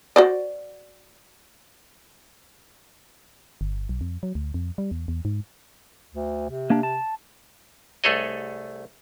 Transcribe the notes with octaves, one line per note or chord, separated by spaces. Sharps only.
F#4 C5 D5
G1
B1
F2
F#3
D2
F2
G3
E2
E2
G#2
D2
C3
A#3 D4
A5
C2 A3 G#4 A4 C#5 D#5